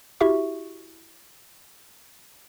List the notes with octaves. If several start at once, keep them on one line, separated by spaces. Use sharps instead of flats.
E4 F#4 G4 E5 C#6